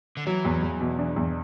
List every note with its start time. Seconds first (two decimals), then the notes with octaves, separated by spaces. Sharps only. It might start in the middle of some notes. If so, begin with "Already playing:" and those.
0.17 D3
0.27 E3 F#3
0.45 E2
0.63 E2
0.81 B2
0.99 D4
1.16 E2